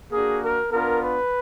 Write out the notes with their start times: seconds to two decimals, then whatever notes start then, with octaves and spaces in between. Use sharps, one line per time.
0.12 A#3 D4 F#4 G#4
0.42 A#4
0.71 B3 D4 F4 A#4
1.01 B4